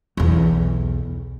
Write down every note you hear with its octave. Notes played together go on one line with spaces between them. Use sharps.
B1 E2